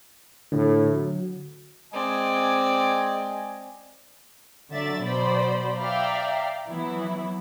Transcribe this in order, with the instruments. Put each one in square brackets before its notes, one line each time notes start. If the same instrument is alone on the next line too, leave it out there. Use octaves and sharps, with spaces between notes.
[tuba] A2 [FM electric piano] D3
[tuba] F#3
[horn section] G#3 D#5 G#5 [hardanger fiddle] C4 D5
[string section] D3 F#3 D5 E5 A6
B2 F#3 C5 D5 B5
D5 E5 F5 G5 A#5
E3 F#3 B3 E4